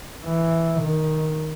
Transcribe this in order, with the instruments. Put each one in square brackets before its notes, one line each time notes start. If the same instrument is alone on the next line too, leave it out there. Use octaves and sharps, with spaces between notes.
[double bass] E3
D#3